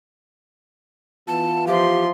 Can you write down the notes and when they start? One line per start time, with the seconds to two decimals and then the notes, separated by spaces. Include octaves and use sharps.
1.28 E3 B3 F4 A5
1.67 F3 G4 C5 E5 F5 C6